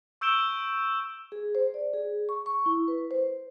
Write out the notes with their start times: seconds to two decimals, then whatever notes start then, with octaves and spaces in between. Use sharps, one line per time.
0.21 C#6 E6 G6 D7 E7 G7
1.32 G#4
1.55 C5
1.74 D5
1.93 G#4
2.29 C#6
2.46 C#6
2.66 E4
2.88 B4
3.11 C5